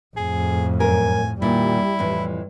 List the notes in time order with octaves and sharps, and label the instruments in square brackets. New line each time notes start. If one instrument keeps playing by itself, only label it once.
[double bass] F2 A2 [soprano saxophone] G#4
[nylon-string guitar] F#2 A#4 [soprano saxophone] G#5
[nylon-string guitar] A#2 D#3 [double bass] G3 [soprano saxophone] E4
[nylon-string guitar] F2 A2 E3